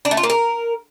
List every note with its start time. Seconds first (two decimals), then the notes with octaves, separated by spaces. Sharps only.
0.05 D4
0.11 A3
0.17 F4
0.23 A#3
0.30 A#4